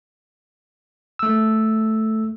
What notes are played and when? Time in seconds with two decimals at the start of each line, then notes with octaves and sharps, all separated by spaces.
1.19 A3 E6